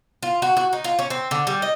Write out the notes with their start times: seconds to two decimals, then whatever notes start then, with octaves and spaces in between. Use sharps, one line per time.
0.23 F4
0.42 F#4
0.57 F#4
0.73 D#4
0.84 F4
0.99 C#4
1.10 C4
1.31 D3
1.47 G3
1.62 D#5